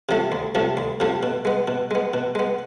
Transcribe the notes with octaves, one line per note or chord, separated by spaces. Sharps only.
C3 F3 A3
D2
C3 F3 A3
D2
C3 F3 A3
B2
G#3 B3
B2
G#3 B3
B2
G#3 B3